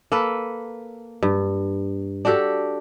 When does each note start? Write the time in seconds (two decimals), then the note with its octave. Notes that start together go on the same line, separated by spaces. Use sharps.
0.12 A#3 A4 B4
1.23 G2
2.25 D4 F#4 G4 A4